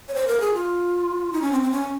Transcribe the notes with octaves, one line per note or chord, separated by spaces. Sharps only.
C#5
C5
A#4
G#4
F4
D#4
C#4
C4
C4
C#4